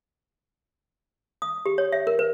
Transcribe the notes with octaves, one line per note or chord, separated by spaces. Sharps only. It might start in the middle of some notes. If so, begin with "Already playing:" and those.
D#6
G4
C#5
E5
A#4
B4